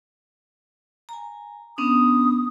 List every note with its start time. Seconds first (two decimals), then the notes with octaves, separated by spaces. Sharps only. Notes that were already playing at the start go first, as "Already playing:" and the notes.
1.09 G#5 A#5
1.78 B3 C#4 D4 D#6